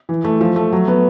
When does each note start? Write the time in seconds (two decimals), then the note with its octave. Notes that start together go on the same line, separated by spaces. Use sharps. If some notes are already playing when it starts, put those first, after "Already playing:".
0.09 E3
0.24 A3
0.41 F3
0.56 A3
0.72 F#3
0.88 B3